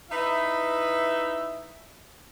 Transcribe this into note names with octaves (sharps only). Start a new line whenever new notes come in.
D#4 E4 B4 E5